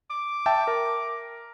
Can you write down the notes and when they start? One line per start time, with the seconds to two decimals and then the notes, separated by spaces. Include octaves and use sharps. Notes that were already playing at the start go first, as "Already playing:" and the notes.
0.10 D6
0.46 E5 G5 A5
0.67 A#4